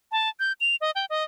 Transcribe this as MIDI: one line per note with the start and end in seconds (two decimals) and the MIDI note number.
0.12 0.29 81
0.40 0.53 91
0.61 0.76 101
0.81 0.91 75
0.95 1.05 79
1.10 1.24 75